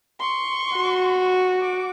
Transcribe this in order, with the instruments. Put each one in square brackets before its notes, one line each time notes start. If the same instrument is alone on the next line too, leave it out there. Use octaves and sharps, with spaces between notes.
[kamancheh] C6 C#6
[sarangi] F#4
[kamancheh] D6